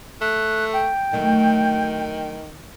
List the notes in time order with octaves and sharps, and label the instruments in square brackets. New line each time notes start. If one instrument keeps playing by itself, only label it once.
[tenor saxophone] A3 [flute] F#6
[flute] G5
[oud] D2 F#3 A3 [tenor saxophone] D#3